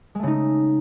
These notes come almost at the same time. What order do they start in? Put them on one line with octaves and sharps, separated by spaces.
G#3 A3 C#3 D#4